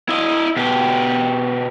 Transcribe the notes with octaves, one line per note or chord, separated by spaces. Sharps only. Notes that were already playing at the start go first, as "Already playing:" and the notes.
E4 D#5
B2 G4